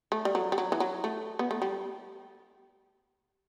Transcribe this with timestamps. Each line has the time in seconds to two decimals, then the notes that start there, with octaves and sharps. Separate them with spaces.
0.12 A3
0.25 G3
0.35 F#3
0.52 G3
0.58 F#3
0.72 E3
0.80 F#3
1.04 A3
1.39 B3
1.51 A3
1.62 G3